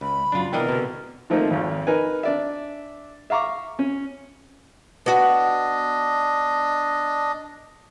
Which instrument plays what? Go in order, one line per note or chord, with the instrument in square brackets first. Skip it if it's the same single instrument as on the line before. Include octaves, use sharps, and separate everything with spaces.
[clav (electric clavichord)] C#2 [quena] B5
[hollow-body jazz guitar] F#2 C#3 F#3 [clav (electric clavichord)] D4 F4
[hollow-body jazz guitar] C3 B3 G5 [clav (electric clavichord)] E3 D4 D#5 [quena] A#4
[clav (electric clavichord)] B2 D3
[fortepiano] D#3 F3 A3 A#3 C4 D#4
G#1 F2
D#4 A#4 B4 G#5
D4 D5 E5
E5 F5 A#5 C#6 D6
C#4
[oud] B3 F#4 [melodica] D4 D#5